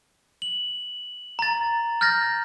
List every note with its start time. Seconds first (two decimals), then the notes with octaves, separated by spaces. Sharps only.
0.42 F#7
1.39 A#5 A6
2.01 F6 G6 A6 A#6